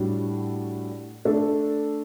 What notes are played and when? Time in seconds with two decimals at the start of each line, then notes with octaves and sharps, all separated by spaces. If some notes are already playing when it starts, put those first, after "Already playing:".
Already playing: A2 G3 D4 F#4
1.25 A3 D4 A4